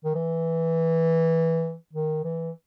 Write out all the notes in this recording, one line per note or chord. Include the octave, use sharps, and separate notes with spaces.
D#3
E3
D#3
E3